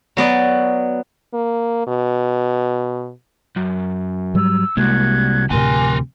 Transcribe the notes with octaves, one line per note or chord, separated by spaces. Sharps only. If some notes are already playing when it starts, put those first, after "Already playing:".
F#3 B3 D5
A#3
B2
F#2
G#2 F#3 G3 E6
C2 G#3 A#3 F#4 F#6 G#6
D2 A2 C3 F3 G4 A#4 G#5 C6